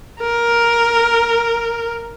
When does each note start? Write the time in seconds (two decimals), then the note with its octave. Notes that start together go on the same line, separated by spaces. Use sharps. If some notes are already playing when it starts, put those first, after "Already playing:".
0.20 A#4